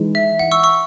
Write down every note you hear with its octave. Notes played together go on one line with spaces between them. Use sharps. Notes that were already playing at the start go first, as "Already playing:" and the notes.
Already playing: E3 G#3 D#4
E5
F#5
C#6 E6
C#6 E6